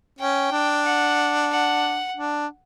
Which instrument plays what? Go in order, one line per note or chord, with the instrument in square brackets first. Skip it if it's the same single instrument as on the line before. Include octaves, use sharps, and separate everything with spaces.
[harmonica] C#4 [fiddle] G5
[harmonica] D4
[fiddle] F#5
F#5
[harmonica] D4